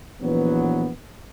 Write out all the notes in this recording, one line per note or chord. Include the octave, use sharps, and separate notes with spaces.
A#1 E3 F#3 B3